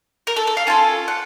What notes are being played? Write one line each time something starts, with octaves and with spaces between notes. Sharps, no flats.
A#4
A4
A4
F5
C#4 F4 A4 A5
F#5